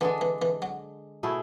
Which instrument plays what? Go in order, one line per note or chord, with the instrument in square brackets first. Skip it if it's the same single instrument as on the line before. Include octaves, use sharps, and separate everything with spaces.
[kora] D3 G#3 D4 [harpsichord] E3
[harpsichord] E3
E3
F#3
[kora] B2 A3 E4 G#4